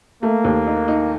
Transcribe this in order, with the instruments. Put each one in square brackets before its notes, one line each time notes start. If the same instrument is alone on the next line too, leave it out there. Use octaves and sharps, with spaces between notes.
[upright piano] A3 [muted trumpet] A#3
[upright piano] D#2
D#4
D#4